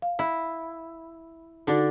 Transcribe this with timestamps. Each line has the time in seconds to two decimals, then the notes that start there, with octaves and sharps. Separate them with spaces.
0.02 F5
0.19 E4
1.67 D3 D4 D#4 F#4 A4